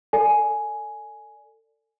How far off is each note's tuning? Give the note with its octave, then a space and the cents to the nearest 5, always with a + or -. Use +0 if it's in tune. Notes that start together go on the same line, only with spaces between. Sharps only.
A4 +30 D5 -5 G#5 +10